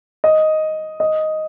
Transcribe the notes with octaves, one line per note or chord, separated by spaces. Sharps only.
D#5
D#5